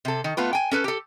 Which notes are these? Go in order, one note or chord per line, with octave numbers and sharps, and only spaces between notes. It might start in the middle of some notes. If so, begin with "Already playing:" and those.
C3 A4
D#3
A3 B3 F4 B4
G5 G#5
C#4 A4 B4
G4 A4